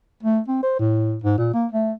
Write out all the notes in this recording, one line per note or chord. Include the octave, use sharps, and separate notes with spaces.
A3
C4
C5
A2
G#2
A#2
A#3
A3